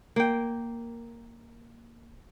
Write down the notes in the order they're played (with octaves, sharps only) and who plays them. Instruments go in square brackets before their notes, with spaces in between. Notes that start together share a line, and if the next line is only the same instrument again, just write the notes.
[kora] A#3 G5